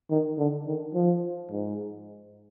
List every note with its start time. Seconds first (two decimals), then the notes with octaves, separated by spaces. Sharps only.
0.10 D#3
0.38 D3
0.67 D#3
0.95 F3
1.51 G#2